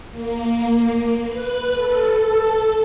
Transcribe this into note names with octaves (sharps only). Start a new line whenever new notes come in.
A#3
B4
A4